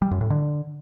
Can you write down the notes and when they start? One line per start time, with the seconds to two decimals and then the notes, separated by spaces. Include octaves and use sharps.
0.02 G3
0.11 F#2
0.21 A2
0.30 D3